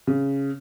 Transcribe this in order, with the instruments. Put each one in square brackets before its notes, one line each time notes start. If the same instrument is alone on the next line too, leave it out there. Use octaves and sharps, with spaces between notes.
[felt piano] C#3